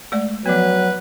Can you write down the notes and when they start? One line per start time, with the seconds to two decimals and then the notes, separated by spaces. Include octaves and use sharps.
0.12 G#3 A3 D5
0.46 F3 F#3 B3 B4